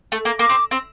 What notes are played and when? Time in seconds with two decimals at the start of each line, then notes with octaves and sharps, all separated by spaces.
0.12 A3
0.25 A#3
0.39 A#3 D6
0.49 C4
0.71 C4